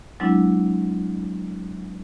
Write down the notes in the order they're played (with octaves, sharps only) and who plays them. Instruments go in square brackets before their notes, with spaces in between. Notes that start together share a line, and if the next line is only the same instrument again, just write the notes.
[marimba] F#3 G#3 C4 D4 E4